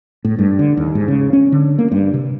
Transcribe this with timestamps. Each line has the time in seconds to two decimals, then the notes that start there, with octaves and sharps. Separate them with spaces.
0.25 A2
0.39 G2
0.59 D3
0.77 D#2
0.95 G#2
1.08 C#3
1.33 C#4
1.52 D3
1.78 A#3
1.92 G2
2.14 C3